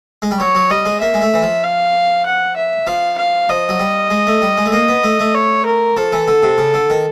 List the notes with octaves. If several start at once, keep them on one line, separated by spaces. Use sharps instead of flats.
G#3
G3
F#3 C#5
F#3
G3 D#5
G#3
A#3 E5
G#3
A3
E3
F3
F5
F#5
E5
F3 F5
F5
F3 D#5
F#3
G3
G#3
A3
G3
G#3
A3
A#3 D#5
B3
A3
A3
C#5
A#4
F3 A4
E3
D3
C3
C#3
D3
D#3